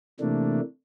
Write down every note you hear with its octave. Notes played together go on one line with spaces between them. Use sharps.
C3 E3 A3 A#3 D4